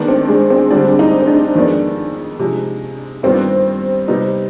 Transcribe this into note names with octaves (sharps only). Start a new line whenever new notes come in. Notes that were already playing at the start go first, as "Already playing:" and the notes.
Already playing: D#3 G#3 B3 D4
C4
G#3
C4
D3 G3 C4 D4
D#4
C4
D4
F2 D#3 G#3 B3 D4
C3 F3 G#3
G2 D#3 G3 B3 C4 F4
C3 G3 B3 D#4